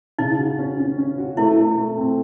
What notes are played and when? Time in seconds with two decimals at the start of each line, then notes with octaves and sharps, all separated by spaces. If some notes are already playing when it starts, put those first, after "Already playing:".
0.19 C#3 D#4
0.39 F#4
0.59 C#4
0.79 C#4
0.98 C#4
1.18 F#4
1.37 A3 E4
1.58 A3
1.77 A3
1.97 C4